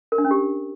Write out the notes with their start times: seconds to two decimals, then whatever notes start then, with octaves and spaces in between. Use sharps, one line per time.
0.12 A#4
0.18 D4
0.25 C#4
0.31 G4